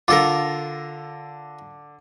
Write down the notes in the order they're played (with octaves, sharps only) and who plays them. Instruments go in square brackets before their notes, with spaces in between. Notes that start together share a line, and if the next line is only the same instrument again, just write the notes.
[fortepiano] D3 D6 [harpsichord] F4 A4 A#4